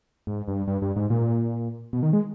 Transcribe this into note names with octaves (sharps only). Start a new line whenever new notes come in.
G#2
G2
G2
G2
G#2
A#2
B2
D#3
G#3